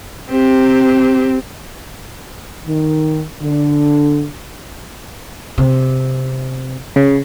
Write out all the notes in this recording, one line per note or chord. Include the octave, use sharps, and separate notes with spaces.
C4 G4
D#3
D3
C3
C#3